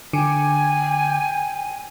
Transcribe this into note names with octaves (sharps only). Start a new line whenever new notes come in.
D3 G5 G#5